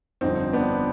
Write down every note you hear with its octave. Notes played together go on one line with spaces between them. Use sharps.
G1 F2 D3 C4 D#4
B3 D4